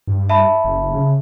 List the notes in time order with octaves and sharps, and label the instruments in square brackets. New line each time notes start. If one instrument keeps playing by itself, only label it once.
[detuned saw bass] G2
[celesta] E5 A5 B5
[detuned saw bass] F#1
C#3